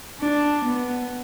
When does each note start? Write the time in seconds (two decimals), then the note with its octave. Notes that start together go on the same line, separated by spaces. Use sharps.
0.21 D4
0.65 B3